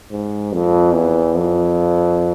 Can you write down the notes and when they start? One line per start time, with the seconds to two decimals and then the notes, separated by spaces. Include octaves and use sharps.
0.11 G#2
0.53 F2
0.94 E2
1.36 F2